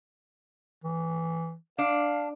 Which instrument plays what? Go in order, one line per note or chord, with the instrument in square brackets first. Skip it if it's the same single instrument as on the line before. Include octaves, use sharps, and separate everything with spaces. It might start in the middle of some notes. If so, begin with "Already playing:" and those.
[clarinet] E3
[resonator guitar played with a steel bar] D4 [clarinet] F5